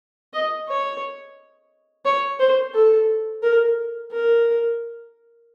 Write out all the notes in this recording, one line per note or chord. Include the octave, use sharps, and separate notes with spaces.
D#5
C#5
C#5
C5
A4
A#4
A#4